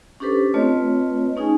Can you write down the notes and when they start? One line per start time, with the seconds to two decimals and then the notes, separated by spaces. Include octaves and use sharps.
0.20 C#4 D4 G4 A4 B4 C5
0.54 A3 C4 F4 B4 C#5 D#5
1.36 A3 C#4 D#4 G#4 G#5